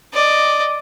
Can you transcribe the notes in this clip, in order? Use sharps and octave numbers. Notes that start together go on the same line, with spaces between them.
D5 D#5